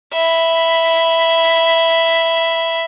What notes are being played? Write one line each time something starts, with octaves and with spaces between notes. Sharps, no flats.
E5 B5